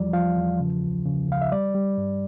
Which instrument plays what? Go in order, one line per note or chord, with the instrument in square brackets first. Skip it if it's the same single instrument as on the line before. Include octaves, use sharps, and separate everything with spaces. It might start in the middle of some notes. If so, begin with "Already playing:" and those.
Already playing: [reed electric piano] E2 F3 G3 D5
F3 F5
E2
C#3
C#2
C#3
C#2 F5
E5
G3 D5
G3
G2